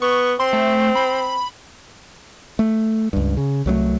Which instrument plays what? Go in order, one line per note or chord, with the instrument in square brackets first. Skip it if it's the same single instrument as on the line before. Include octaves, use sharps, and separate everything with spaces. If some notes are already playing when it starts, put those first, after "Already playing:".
[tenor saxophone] B3 [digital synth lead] C#6
[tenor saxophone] C4 [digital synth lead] C6
[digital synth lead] A3
B5
[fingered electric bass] A3
C#2 G2
C#3
C2 F#3 G#3 A3